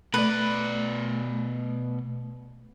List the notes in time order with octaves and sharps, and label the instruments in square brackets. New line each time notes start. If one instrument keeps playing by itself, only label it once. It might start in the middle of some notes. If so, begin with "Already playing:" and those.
[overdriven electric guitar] B2 D5 [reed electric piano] A3 [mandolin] B4